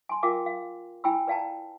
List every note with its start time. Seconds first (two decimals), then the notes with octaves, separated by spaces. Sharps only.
0.09 G#5 A5 C6
0.23 F4 A#4 F5 G5 D6
0.46 F5
1.04 E4 G5 G#5 B5 E6
1.27 B4 D5 F5 G5 A5 A#5